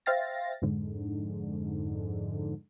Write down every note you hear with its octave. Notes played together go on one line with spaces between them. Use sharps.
C5 E5 F5 G5 A6 A#6
F2 G#2 D3